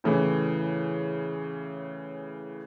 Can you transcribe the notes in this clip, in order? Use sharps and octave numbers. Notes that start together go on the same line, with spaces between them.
A2 C#3 E3